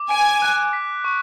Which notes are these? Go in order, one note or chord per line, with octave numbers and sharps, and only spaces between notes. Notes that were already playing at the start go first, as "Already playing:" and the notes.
Already playing: D6
G#5 D7
F#6
B6
C#6